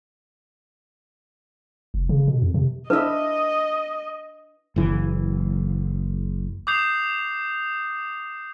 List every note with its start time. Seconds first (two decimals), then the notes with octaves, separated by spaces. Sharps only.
1.94 F1
2.09 C#3
2.28 B2
2.42 F2
2.54 C3
2.90 D4 E4 B4 D#5 E5
4.76 F#1 E3
6.67 D6 D#6 G6 C7 F7